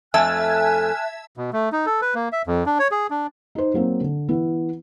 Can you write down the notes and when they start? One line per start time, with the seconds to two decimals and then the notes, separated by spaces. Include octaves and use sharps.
0.14 F2 A3 E5 G#5 A5 F6 F#6 G#6
1.37 B2
1.53 A3
1.72 D#4
1.86 A4
2.02 B4
2.15 A#3
2.32 E5
2.47 F2
2.66 D4
2.79 C#5
2.91 G#4
3.10 D4
3.55 D#4 C5
3.74 F#3 A#3 C4
4.01 D3
4.29 E3 B3 E4